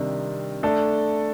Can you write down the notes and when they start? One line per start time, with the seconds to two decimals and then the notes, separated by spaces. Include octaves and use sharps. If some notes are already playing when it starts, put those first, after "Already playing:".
Already playing: C3 D#3 G3 D4
0.63 A3 D4 A4